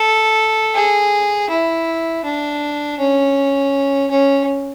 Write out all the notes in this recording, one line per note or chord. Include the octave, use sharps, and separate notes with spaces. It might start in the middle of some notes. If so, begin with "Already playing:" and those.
Already playing: A4
G#4
E4
D4
C#4
C#4